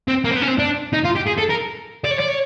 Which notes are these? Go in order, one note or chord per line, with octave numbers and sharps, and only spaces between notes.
C4
A#3
C4
B3
C#4
C4
D4
D#4
F4
G4
G#4
A4
A#4
D5
C#5
D5
C#5